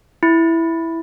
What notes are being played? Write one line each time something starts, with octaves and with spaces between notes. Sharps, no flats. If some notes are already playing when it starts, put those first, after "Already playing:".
E4